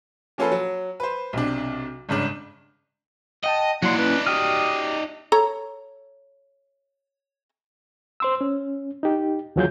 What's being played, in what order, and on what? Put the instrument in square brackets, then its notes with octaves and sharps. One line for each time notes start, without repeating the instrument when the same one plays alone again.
[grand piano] F3 A#3 C#4 F4 A4 B4
F#3
B4 C5
B1 C3 D4
G1 G#2 C#3 D4
[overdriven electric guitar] D#5 [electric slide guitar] F#5 G5 A5
[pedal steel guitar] F#3 C6 [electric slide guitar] A#3 E4 [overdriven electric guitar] D#4 D5 [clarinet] F#5
[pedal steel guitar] C#4 [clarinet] B4
[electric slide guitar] F#4 [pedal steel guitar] G4 G5 F6 [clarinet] D#6
[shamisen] A4 C#5 A#5
[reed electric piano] C5 C6 E6
C#4
D#4 G4
D#2 E3 F#3 F4 G#4 G6